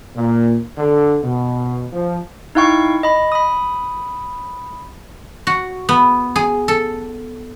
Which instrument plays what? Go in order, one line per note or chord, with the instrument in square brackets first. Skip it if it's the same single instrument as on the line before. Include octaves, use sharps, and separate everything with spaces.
[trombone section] A#2
D3
B2
F3
[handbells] D#4 E4 F5 G5 C#6
D#5 B5
B5 D#6
[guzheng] F#4
B3
G#4
A4